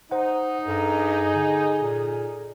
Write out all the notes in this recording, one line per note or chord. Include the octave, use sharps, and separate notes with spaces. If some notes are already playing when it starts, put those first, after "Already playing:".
D#4 C5 F#5
G2 G#4 A4 A#5
D3
A#2